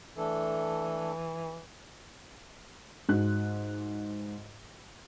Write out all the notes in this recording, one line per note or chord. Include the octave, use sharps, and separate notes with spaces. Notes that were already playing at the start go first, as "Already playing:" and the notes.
E3 A3 D4 A4
G#2 F#4 F#6